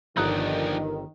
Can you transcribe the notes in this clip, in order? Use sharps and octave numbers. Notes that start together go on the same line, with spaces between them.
G1 D#3 F3 D4 F#5 A#5 D#6 F#6